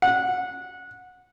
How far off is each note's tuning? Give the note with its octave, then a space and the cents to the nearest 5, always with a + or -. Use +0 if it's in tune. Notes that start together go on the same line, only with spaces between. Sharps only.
F#5 -20